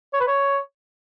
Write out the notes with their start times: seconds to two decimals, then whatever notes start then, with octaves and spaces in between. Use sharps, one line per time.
0.14 C#5
0.20 B4
0.27 C#5